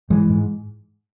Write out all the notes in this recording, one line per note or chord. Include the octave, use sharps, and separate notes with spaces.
G#2 E3 G#3
G#2